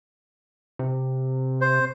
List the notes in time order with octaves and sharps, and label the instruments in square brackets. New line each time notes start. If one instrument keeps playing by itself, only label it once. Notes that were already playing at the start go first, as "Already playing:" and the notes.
[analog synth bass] C3
[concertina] C5